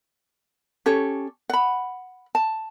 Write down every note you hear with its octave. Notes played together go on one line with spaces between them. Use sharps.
C#4 G4 A4 C#5
F#5 B5
A5